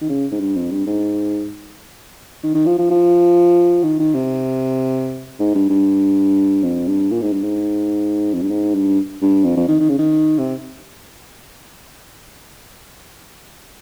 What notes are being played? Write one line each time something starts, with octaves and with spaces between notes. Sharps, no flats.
D#3
C#3
G#2
G2
F2
G2
G#2
D#3
D#3
F3
F3
F3
D#3
D#3
C3
G#2
G2
G2
F2
G2
A#2
G#2
G2
G#2
F2
G2
G#2
G2
G2
F2
F2
D#3
D#3
C#3
D#3
C3